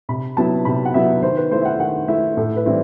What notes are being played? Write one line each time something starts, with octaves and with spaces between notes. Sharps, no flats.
C3 B5
F#3 B3 E4 A5
C3 B5
F#5
F#3 B3 E4 E5
D#3 C5
B4
A3 E4 C5
E5
F#5
D#3 F#5
A3 E4 E5
A2 A4
B4
E3 G3 C4 E4